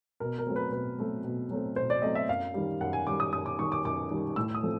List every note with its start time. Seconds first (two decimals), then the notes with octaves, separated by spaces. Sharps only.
0.20 B2 A#4
0.38 A#4
0.47 F#3 A3 C4
0.56 B4
0.72 B2 B4
0.99 F#3 A3 C4
1.24 B2
1.51 F#3 A3 C4
1.76 B2 C5
1.90 D5
2.02 F#3 A3 C4 D#5
2.15 E5
2.29 F#2 F5
2.54 D#3 G3
2.81 F#2 F#5
2.93 G#5
3.06 D#3 G3 D6
3.20 D#6
3.32 F#2 D#6
3.46 D6
3.58 D#3 G3 C#6
3.72 D6
3.85 F#2 D6
4.11 D#3 G3
4.36 A2 E6
4.55 D#6
4.63 F3 A3 C4